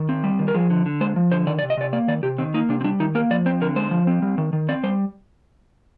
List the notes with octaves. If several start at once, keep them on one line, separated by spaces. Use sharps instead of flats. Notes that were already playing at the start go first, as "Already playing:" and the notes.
Already playing: D#3
C4
G3
D#3
A#4
F3 G#4
D3
D3
G#3 C5
F3
D3 C5
D#3 D5
D5
C3
D#5
C3 D5
A#3 D5
D#3 D5
C3 G4
D#3 C4
A#3 D#4
C3 D4
C4
G3 D4
D#3 D#4
A#3 A#4
F3 D5
C4 C5
D3 A#4
G#3 C5
F3
C4
G3
D#3
D#3
C4 D5
G3 C5